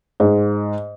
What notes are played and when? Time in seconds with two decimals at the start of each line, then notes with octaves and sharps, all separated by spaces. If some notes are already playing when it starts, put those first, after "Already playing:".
0.20 G#2